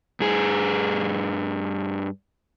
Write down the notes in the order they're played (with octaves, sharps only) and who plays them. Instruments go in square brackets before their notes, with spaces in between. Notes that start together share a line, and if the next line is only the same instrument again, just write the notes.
[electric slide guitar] G2 G#4